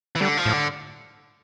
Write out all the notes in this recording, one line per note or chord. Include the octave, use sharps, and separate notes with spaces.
E3
D3 G3
F3
A2
D3